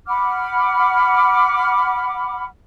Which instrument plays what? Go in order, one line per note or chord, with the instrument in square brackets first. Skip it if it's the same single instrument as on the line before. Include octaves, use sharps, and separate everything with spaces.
[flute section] F#5 B5 D6 F6